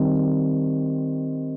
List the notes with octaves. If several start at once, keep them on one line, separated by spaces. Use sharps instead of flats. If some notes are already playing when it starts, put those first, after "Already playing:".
Already playing: D#3 G3 C4